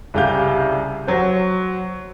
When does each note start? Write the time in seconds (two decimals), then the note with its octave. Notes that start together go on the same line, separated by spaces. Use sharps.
0.14 C2 C#3 G4 F5 G6
1.07 F#3 C5